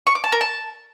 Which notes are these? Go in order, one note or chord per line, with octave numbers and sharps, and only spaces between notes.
C#6
D6
A5
A#4
A5